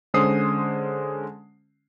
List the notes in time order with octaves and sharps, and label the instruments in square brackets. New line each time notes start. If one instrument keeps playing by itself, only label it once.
[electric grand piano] D3 G#3 C#4 C5 D#6 C7